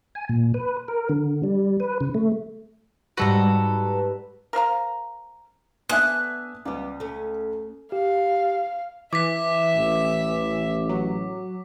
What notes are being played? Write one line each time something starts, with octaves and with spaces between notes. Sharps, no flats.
G#5
A#2
B4
A#4
D3
G3
B4
C#3
A3
G#2 G3 F#4 A4 B4 A#5
A#4 C5 F5 A#5
B3 D4 E5 G#5 D#6 F#6
C#2 G3 B3
A3 C#4
G4 F5
E3 E5 D6 B6
A1
F#3